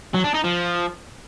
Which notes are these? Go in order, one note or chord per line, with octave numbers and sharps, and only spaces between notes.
F#3
D4
D#4
F3